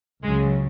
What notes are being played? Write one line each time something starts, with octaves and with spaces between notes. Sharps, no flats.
C#2 C#3 F#3 G#3